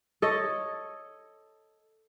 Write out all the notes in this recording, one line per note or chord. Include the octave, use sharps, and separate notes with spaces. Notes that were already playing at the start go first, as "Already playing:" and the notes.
A4 C#5 D#5